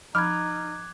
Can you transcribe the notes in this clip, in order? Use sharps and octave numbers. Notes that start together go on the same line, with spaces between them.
F3 D#4 B5 D6 F6 F#6 G#6